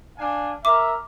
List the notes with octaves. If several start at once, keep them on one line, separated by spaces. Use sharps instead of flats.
D4 F5 G#5
A#4 E5 D6